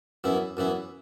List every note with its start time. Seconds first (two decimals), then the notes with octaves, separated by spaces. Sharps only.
0.24 F#2 E3 B3 E4
0.57 F#2 E3 B3 E4